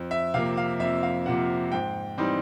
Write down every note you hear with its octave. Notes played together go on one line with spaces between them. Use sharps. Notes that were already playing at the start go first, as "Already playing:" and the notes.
Already playing: F2
E5
C3 F3 A#3 F5
F5
F2 E5
F5
C3 F3 A#3 F#5
G#2 G5
E3 G3 C4 D#4